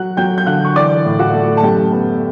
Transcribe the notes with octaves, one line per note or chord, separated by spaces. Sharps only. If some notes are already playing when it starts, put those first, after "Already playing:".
Already playing: F#3 F#5 F#6
F#3 G5 G6
G6
D3 F#5 F#6
C#6
E3 D5 D6
A2
F#4 F#5
A3
A5
F#2 G4 G5
B3